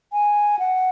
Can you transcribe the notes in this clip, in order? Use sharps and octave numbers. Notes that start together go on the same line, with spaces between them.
G#5
F#5